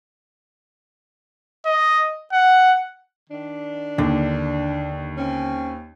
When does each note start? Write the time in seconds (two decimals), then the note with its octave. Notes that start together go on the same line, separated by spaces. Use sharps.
1.65 D#5
2.33 F#5
3.30 D#3 D4
3.98 D#2 D3
5.17 C4 C#4